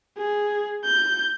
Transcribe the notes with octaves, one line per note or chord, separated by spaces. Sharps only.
G#4
G6